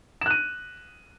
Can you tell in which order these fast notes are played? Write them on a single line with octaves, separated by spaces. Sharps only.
E7 F#6 D#7